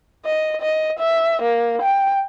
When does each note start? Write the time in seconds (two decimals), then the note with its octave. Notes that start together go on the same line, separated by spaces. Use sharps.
0.25 D#5
0.62 D#5
0.99 E5
1.42 A#3
1.82 G5